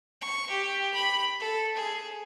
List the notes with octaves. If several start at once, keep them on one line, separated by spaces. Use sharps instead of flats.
C#6
G4
B5
A4
G#4